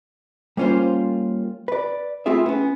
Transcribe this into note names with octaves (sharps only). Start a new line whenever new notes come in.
G3 A#3 C#4 F4 C5
B4 D5
A3 C4 E4 F4 G#4 E5
B3 C#4